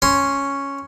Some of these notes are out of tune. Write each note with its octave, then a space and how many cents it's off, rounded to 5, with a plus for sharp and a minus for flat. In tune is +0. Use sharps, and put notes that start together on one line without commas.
C#4 +0 C6 +0